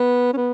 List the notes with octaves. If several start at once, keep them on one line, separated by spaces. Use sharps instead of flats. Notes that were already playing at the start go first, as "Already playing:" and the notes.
Already playing: B3
C#4
B3